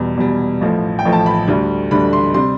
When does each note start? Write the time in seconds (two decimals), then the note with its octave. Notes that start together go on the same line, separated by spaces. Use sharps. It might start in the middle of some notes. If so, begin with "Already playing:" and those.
Already playing: E2 B2 G3
0.17 E2 B2 G3
0.61 A1 A2 F3
0.99 G5
1.05 A1 A2 F3
1.13 A5
1.26 B5
1.47 D2 D3 G3
1.91 D2 D3 G3 B5
2.13 C6
2.34 C3 G3 C6